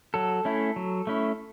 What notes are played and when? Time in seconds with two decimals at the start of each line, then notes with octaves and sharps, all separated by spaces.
0.14 F#3 A4
0.45 A3 C#4 E4
0.76 F#3
1.07 A3 C#4 E4